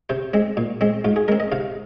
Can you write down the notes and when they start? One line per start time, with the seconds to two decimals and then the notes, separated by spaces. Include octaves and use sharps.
0.09 C3 C5
0.34 G#3 C4
0.57 A#2
0.81 G#3 C4
1.04 G#2 F4
1.16 G#4
1.28 G#3 C4 A#4
1.40 D#5
1.52 C3 F5